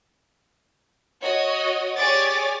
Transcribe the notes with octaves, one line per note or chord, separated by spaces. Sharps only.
F#4 C#5 D#5
G4 G#4 C#5 D5 D6 A6